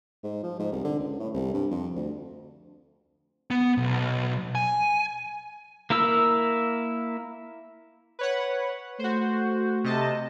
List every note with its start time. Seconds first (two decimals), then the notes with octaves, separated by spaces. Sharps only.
0.23 G#2
0.43 F3
0.59 G#2
0.72 C2
0.84 D3
0.99 C#2
1.20 A2
1.34 C2
1.54 G2
1.71 F2
1.95 D2
3.51 B3
3.78 B1
4.55 G#5
5.90 A#3 E4 A#4 E6
8.19 B4 C#5 F#5
8.99 A3 F#4 C5
9.84 C3 D#5 A5